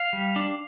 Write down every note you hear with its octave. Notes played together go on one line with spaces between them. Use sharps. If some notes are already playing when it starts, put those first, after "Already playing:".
Already playing: F5
G3
D4